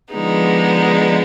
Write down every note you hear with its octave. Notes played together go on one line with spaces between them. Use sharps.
D3 F3 G#3 B3 D#4